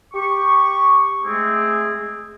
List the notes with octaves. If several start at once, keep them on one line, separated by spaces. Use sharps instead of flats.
G4 C#6
G#3 A3 C4 G#4